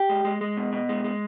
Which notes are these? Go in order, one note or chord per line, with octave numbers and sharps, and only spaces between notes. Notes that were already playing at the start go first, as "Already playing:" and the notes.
Already playing: G4
G#3
G#3
G#3
B2
B2
G#3
G#3